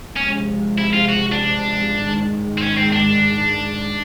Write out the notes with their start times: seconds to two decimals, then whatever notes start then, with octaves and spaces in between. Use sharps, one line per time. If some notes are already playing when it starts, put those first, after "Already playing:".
0.17 C3 F3 G#3 C#4
0.78 E4
0.93 F4
1.09 F#4
1.32 D4
2.00 G#2 D#3 G#3
2.58 C4
2.62 C#4
2.77 C4
2.92 D4